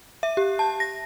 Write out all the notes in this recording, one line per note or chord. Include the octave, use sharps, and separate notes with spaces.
E5
G4
A5
A#6